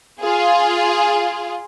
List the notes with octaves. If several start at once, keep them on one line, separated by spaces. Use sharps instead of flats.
F4 G#4